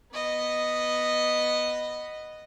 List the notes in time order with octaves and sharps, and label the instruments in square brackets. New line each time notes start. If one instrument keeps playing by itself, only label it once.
[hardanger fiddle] B3 D#5